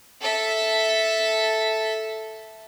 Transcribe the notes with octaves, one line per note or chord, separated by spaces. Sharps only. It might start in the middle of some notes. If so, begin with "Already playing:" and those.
A4 E5